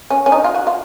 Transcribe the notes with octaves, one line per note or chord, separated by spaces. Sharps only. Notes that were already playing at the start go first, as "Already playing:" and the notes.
C#4
C#4
D#4
F4
F#4
F4